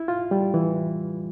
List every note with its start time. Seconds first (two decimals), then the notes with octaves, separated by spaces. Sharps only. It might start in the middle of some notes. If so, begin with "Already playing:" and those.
Already playing: E4
0.08 F4
0.31 G3
0.54 E3